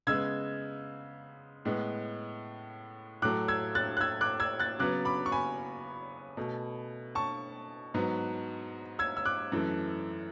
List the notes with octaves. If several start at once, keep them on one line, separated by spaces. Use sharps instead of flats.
C#3 G#3 B3 E6 G#6
A2 G#3 B3
A2 F#3 A3 D6 F#6
E6 G#6
F#6 A6
F#6
E6 G#6
D6 F#6
E6 G#6
F#6 A6
C#3 F#3 B3 D6 F#6
B5 D6
C#6
G#5 B5
B2 A3
A5 C#6
G#2 F#3 B3
E6 G#6
E6
D6 F#6
F#2 E3 A3